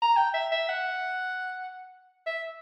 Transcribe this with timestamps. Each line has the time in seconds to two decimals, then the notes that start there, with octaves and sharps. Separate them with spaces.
0.02 A#5
0.16 G5
0.34 E5
0.52 E5
0.69 F#5
2.26 E5